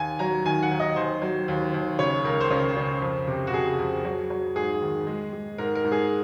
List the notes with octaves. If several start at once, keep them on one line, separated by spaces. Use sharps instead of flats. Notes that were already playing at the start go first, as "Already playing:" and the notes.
Already playing: D#2 G#5
F#3 A#5
D#3 G#5
F#5
D#2
D#5
D#2 C5
F#3
D#2
D#2
C#3 C#5
C#2 A#4
C5
C#3 A#4
C#3
F2
C3
F#4
C3 G#4
F2
F#3
F#3
G#2 G#4
D#3
G#3
G#3
G#2 A#4
A#4
G#2
G#4